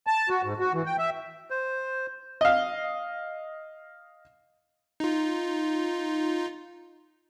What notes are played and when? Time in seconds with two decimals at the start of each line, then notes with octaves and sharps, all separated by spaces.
0.07 A5
0.29 F#4
0.44 G#2
0.60 F#4
0.73 E3
0.86 G5
0.99 E5
1.50 C5
2.41 D#5 F5
5.00 D#4 F4